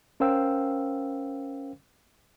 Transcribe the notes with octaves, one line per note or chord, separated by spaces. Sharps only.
C#4 A#4 C5 F5 G5 E6